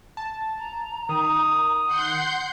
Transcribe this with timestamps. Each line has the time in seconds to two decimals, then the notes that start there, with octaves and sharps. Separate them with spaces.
0.17 A5
0.59 A#5
1.09 D#3 D#6
1.86 F#5 C6 G6